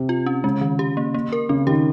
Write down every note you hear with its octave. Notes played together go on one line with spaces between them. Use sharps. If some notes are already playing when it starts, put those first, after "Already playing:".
Already playing: C3
F4
C#4
C#3 G#3
D#3
G4
A#3
A#3
A#4
C#3 C4
D#3 G4